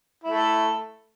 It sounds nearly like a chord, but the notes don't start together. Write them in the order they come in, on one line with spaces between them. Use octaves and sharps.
E4 A3 A4